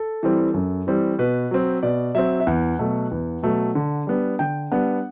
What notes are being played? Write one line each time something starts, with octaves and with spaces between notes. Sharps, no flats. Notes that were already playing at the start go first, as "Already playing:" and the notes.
Already playing: A4
E3 G3 C4
F#2
E3 G3 C4
B2 B4
F#3 C4
B2 D5
F#3 C4 E5
E5
E2 F#5
B2 F#3 A3
E2
B2 F#3 A3
D3
G3 B3 D4
D3 G5
G3 B3 D4 F#5